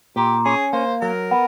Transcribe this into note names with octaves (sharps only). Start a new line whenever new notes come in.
A#2 G4
C#4 G#4
A#3 C5
F#3 A#4
B3